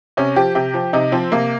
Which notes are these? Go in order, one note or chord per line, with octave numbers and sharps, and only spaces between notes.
C3 C#4
F3 G4
C3 G4
F3
C3 D#4
F3 C4
C3 A#3